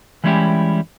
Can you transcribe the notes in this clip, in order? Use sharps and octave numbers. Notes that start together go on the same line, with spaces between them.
E3 G3 G#3 C#4 E4 G4